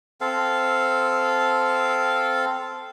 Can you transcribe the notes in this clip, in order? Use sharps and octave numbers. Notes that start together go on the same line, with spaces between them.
C4 A4 F5